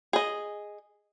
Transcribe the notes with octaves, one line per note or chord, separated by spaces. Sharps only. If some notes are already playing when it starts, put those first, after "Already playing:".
G#4 D#5